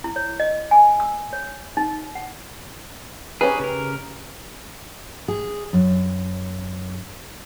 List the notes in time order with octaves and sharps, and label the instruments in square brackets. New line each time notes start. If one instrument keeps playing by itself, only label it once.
[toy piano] E4
C#5
D#5
G#5
E6
C#5
D#4
F#5
[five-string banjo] C#4 G4 B4 [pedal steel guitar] D#4 G#4
[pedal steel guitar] C#3 A#4
[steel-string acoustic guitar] G#4
F#2